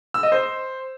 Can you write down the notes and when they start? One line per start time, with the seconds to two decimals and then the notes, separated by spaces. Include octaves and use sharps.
0.14 E6
0.23 D#5
0.32 C5